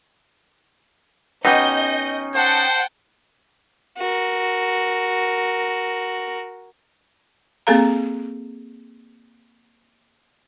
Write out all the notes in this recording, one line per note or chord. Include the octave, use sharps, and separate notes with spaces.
B2 C#4 D#4 G4 D#5 G6
C5 F#5 G5 A5
F#4 A#4
A#3 C4 G#4 A4 F5 A#5